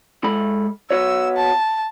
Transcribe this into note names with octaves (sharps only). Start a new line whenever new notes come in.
G#3 A4 B5
B3 F#4 C#5 E6
A5